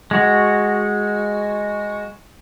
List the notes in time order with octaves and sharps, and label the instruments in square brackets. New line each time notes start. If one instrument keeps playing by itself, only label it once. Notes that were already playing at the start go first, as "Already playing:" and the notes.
[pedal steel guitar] G#3 F#4